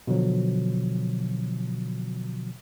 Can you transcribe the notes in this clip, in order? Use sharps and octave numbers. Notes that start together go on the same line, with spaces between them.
B2 D3 F3 F#3